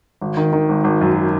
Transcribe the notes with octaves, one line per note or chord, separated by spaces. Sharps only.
G#1
D#3
D#3
G#1
G#1
F#2